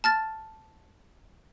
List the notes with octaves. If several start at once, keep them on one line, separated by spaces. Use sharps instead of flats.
A5 F6 A6